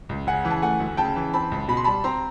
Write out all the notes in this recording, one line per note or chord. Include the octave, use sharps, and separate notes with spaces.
C#2
C#3 F#5 G#5
E3
A5
A3 F#5 G#5
D2
C#3 G5 A5
E3
C4 A5 B5
C#2
B2 B5
C6
G3 A5 B5
C4 A#5 C6